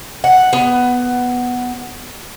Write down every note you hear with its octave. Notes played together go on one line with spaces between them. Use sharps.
F#5
B3